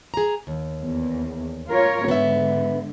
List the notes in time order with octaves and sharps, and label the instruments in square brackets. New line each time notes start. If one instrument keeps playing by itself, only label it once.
[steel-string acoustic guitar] G#4 A#5
D#2
[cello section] E2
F4 A#4 C#5
[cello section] G#2 D3 [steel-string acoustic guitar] B3 E5